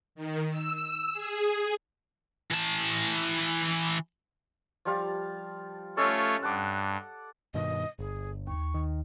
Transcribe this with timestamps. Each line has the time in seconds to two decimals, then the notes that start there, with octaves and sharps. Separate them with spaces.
0.15 D#3
0.51 E6
1.13 G#4
2.51 E3 A5
4.85 F3 G3 F4
5.97 A3 C#4 F4 A4 C#5 D#5
6.43 G2 F#5 A5 D6
7.54 G2 B2 D#3 D#5
7.99 G1 G#4
8.47 D#2 C#6
8.74 D#3